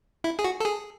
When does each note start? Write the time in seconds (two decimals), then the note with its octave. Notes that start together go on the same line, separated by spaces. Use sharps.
0.24 E4
0.39 G#4
0.44 F#4
0.60 A4
0.65 G#4